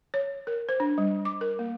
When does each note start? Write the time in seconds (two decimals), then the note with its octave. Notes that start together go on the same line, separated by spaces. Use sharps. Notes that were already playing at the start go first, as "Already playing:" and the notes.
0.14 C#5
0.47 A#4
0.69 C5
0.80 D4
0.98 G3
1.25 D6
1.41 A#4
1.59 A#3